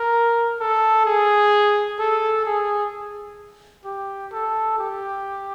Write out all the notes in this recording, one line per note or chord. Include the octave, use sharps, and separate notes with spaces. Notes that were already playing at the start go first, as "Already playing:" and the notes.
Already playing: A#4
A4
G#4
A4
G#4
G4
A4
G4